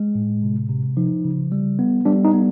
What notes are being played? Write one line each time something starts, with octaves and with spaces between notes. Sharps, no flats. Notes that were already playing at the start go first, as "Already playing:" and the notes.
Already playing: G#3
A2
C3
C3
F3 D#4
C#3
G3
B3
G3 D4
D#4
B3